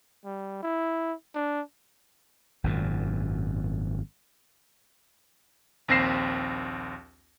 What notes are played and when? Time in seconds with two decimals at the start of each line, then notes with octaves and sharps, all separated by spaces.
0.25 G3
0.63 E4
1.35 D4
2.64 G#1 F#2 A#2
5.88 A#1 D#2 C4 A#6 C7 E7